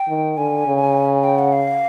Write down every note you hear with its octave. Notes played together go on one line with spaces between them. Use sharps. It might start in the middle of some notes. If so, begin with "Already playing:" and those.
Already playing: G5
D#3
D3 G#5
C#3
G5
F#5
F5